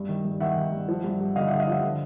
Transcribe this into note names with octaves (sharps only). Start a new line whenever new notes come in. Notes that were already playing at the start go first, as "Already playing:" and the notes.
Already playing: G2
D#3
G2
D#3 E5 F#5
D#3
G2
F3
G2
G2
D3 D#5 F5
E5 F#5
D3
D#5 F5
F3 E5 F#5
D3